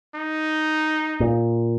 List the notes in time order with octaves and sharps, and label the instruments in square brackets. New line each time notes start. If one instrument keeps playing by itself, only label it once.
[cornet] D#4
[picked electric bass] A#2